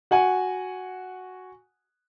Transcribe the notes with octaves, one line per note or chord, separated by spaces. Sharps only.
F#4 F#5 G#5